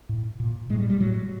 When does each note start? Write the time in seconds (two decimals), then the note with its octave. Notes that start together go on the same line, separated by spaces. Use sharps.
0.09 A2
0.40 A#2
0.70 A2 G#3
0.80 G3
0.90 G3
1.00 A2 F#3